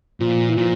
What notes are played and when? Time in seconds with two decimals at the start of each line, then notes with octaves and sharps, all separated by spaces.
0.20 A#2 F3
0.50 E3
0.57 A#2 F3